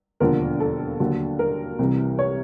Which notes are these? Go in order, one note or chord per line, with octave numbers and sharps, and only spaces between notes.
E1 D#2 D3 F3 A#4
A4
D#2 D3 F#3
A#4
C2 C3 E3 G3
C#5